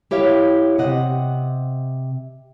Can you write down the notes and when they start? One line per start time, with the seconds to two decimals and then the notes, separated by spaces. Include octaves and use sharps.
0.11 E4 G4 C#5 E5 F5
0.78 C3 D#5 F#5